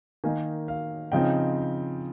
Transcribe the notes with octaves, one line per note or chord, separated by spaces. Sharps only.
D#3 A#3 D#4 F5 G#5
F5
C#3 F3 C4 D#4 D#5 G5